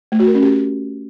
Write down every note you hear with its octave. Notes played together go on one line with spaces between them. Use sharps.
A3
F#4
A#4
C#4
G4